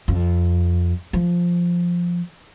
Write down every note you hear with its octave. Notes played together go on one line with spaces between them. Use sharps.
F2
F3